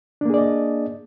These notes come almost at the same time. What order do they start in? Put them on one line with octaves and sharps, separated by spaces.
D4 A#3 G#4 D5 D#5